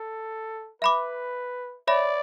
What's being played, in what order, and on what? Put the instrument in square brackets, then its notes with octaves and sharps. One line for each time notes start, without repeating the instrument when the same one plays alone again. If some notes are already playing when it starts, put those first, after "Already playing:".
Already playing: [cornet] A4
[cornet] B4 [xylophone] E5 B5 D6
[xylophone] C#5 E5 B5 [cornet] D5